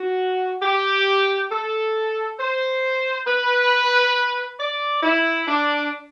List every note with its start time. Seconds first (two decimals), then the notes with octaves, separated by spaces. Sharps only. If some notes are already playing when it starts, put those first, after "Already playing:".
Already playing: F#4
0.62 G4
1.51 A4
2.39 C5
3.27 B4
4.60 D5
5.03 E4
5.47 D4